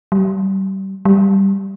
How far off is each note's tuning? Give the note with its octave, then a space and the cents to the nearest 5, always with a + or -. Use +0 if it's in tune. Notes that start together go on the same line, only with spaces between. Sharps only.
G3 -30
G3 +0